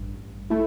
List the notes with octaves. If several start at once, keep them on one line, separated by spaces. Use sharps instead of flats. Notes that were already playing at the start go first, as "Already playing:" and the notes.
Already playing: A1 G2
A3 E4